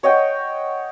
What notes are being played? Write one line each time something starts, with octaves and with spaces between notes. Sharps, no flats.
C#5 D#5 F#5 G5